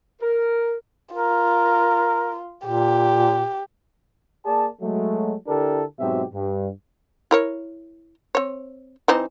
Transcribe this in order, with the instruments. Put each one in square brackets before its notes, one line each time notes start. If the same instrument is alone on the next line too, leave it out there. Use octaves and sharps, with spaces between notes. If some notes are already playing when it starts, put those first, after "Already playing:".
[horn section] A#4
[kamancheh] F4 [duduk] A#4
[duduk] A#2 [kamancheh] G4
[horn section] A#3 G#4 D5 A5
F#3 G#3 A3
D3 D4 E4 G4 A4 A#4
G#2 B2 F#3 C4 G4 E5
G2
[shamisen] E4 A#4 C#5
C4 C#5
E3 C4 D#4